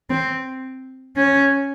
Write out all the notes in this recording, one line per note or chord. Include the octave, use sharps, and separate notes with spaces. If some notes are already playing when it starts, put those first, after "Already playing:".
C4
C#4